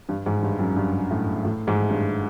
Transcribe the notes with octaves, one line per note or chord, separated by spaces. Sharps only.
G2
G#2
G2
F#2
G2
A2
A2
G#2
G2